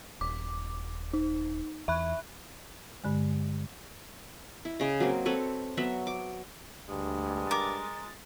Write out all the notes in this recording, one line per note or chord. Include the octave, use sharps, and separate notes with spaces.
D#1 D6
D#4
E2 E5 B5 F#6
G2 D3 G#3
E4
C#3 D#5
F#3 A#3 C4
C4 A4 B4 C#5
F#3 B3 F#4 E5
D6
D2 G2 G#3
A#4 D6 A6